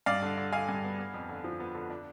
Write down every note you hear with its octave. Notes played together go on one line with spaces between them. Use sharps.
G2 D5 F5
D3
D3
D3 F5 G#5
G2
B3
B3
F2
D3
F3
B3
D3
D4